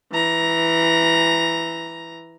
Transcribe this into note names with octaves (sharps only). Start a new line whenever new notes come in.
E3 A#5